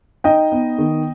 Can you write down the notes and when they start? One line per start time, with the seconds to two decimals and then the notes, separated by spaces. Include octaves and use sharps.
0.24 D#4 D#5 G5
0.52 B3
0.79 D#3